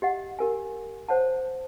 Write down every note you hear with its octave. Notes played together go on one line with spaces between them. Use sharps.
G4 D#5 F#5
G4 A#4 G#5
C5 C#5 F#5 A5